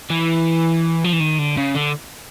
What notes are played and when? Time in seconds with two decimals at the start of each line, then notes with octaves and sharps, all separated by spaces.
0.11 E3
1.04 F3
1.13 E3
1.20 D#3
1.39 D3
1.57 C#3
1.75 D3